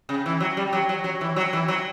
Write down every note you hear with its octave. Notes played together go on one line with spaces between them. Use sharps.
C#3
E3
F#3
G3
F#3
F#3
F#3
E3
F#3
E3
F#3